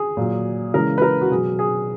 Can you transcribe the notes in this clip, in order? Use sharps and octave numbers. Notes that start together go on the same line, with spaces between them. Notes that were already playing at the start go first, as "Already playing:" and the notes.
Already playing: G#4
A#2 F#3
C#3 E3 G#3 A#4
B4
A#4
F#4
B2 F#3 G#4
G#4